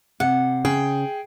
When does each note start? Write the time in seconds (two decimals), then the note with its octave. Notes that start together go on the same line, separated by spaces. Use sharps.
0.20 C3 F#5
0.65 C#3 G#4 G5